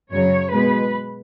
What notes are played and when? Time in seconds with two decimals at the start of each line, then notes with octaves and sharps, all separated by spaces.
0.12 F#2 C#3 F#3 C#5
0.52 B2 G#3 B4